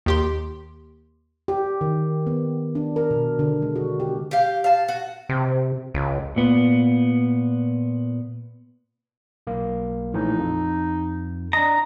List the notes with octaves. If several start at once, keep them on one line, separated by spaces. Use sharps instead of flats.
D#2 G4 C6
G4
D#3
B3
D4
A#4
B2
D3
G#3
F#4
G4
G4 F5
F5 A5
F#4
C3
C#2
A#2 B3
B1 A#3
A#1 A2 E3 D#4
F2
D4 D#5 A#5